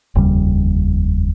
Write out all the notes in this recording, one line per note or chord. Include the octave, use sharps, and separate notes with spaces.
F1 D#2 C#3 G3